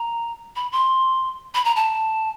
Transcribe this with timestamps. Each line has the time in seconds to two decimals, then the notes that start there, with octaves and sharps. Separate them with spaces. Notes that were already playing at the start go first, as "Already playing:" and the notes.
Already playing: A#5
0.56 B5
0.72 C6
1.55 B5
1.65 A#5
1.76 A5